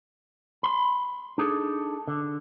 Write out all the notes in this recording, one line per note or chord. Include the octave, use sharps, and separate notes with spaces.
B5 C6
D4 D#4 G#4 A4
D3